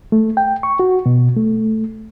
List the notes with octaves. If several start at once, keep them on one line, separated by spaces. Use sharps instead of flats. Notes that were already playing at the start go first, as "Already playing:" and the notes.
A3
G5
C#6
F#4
B2
A3